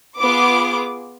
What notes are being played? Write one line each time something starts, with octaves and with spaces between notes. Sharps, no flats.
B3 F4 G#4 D6